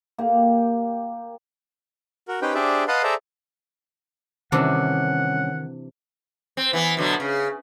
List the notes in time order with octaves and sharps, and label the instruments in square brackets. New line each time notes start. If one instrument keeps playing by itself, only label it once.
[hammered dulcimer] A#3 G4
[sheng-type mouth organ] F#4 A#4
C#4 D#4 G4 B4 C5 G5
D4 G4 G#4 C5 D5 E5
B4 D#5 F5 F#5 A5 C6
G#4 A4 C5 D5 E5 A#5
[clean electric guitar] C2 C#4 [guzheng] C3 E3 D4 [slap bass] D#3 [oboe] F#5
[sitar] C4
E3 B3
B2 D3 F#3
C#3